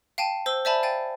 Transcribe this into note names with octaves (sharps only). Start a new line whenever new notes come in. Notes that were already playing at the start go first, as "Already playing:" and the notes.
F5 G5 A5 D#7
C5 E6 G7
C5 D5 E5 G#5 A5 B5
F5 G5 A6 D#7